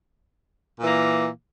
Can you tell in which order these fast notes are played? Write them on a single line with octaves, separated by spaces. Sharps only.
A#2 E3 A#3